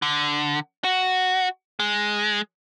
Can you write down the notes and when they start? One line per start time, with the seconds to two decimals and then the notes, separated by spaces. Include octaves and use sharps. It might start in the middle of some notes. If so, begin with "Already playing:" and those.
0.02 D3
0.84 F#4
1.80 G#3